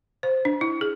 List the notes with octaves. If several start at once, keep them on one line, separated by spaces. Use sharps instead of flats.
C5
D4
E4
G#4